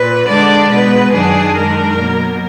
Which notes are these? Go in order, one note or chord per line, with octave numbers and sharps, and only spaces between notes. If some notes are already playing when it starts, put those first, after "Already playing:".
Already playing: A#2 B4
D3 G#3 D4 D5
B2 G#3 B3 B4
F#2 D#3 F#3 D4 G#4
F#2 D#3 G#3 D4 A#4
B2 F#3 A#3